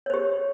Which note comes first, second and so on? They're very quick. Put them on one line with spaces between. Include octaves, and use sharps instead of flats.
C#5 C5 G4